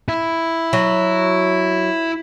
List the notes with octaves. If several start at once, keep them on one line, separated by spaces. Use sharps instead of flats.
E4
F#3